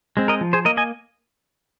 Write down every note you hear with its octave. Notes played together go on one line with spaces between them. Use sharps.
G#3 C4
A#4 D#5
F3
G#4 C5
A#3 A#4 D#5
D#5 G#5